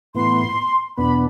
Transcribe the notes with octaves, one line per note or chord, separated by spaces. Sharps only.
A2 E3 B3 C6
E2 B2 B3 D4 B5